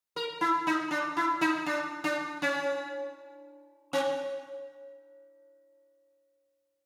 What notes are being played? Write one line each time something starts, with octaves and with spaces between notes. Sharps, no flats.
A#4
E4
D#4
D4
E4
D#4
D4
D4
C#4
C4